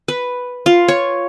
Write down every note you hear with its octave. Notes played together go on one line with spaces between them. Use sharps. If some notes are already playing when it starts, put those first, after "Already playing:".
B4
F4
C#5